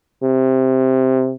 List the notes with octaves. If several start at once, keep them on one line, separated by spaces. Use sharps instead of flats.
C3